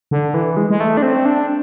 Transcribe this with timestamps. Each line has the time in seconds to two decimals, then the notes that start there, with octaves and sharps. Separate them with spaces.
0.11 D3
0.34 E3
0.57 G#3
0.70 G#3
0.80 A3
0.97 D4
1.02 C4
1.25 D4